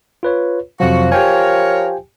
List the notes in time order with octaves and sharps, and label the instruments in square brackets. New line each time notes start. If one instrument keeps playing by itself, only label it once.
[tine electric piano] F4 B4 C#5
[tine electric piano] F2 C3 F#3 [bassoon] F3 [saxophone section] F#4
[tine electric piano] G4 G5 G#5 [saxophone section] A#4 C#5